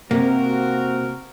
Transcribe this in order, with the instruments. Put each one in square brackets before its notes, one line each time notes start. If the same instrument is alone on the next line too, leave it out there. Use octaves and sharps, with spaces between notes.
[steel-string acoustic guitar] C3 [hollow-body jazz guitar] A#3 [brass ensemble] C4 F#4 A#4